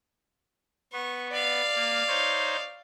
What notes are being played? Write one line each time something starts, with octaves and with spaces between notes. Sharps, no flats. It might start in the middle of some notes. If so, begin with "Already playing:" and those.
B3 C#6
D5 F5
A#3
D#4 C5 C#5